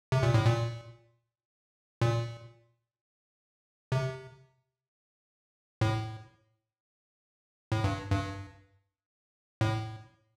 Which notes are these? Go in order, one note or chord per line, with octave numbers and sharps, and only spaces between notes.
C3
A#2
A2
A#2
A#2
C3
A2
A2
G2
G2
A2